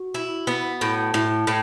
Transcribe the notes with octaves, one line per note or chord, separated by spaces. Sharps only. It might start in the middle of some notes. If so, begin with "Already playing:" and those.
Already playing: F#4
E4
B3
A2
A2 E4
A2